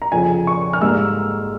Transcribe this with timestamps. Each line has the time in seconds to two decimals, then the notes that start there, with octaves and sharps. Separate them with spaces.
0.02 A#5
0.12 F2 C#3 F3 G#5
0.47 C#6
0.73 F6
0.81 G#2 G3 A#3 E6